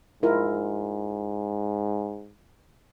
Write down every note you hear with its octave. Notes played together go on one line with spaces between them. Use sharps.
G#2 E4 F4 A#4